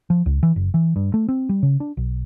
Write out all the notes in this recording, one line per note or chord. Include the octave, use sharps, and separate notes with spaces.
F3
C#2
E3
F#1
E3
G2
A3
C4
G3
C#3
D4
B1